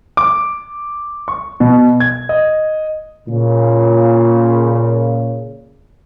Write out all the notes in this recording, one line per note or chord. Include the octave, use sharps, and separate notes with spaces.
D6
C#6
B2
G#6
D#5
A#2 C#3